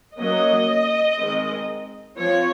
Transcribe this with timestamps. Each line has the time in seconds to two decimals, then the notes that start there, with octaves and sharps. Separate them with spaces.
0.17 F#3 A#3 C#4 D#5
1.17 D#3 G#3 C4
2.18 F3 C4 C#5